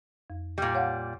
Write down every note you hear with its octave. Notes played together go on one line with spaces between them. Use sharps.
F2
A#2 G3
C#5 F5 F#5